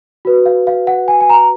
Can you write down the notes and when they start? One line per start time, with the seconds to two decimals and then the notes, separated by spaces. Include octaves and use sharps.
0.25 F#4 B4
0.46 F5
0.67 F5
0.87 F#5
1.08 G#5
1.21 G#5
1.29 A#5